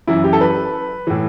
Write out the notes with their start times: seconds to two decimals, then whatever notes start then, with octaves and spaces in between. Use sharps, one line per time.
0.07 F#2 E3 E4
0.24 G4
0.33 A4
0.41 B4
1.07 A2 E3